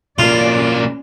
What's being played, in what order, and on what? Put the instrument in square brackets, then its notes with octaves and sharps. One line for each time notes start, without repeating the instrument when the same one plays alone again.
[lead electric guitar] B1 A#3 [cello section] C#4 D5 [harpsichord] F4